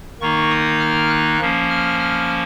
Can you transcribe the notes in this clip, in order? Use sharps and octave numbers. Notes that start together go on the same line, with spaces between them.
D#3 A#3 D#4 C#6
D#6
F6
F#6
F3 A#3 C#4
F6
F6